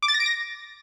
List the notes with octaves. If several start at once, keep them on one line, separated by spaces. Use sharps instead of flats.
D6
A6
A#6
D7
A#6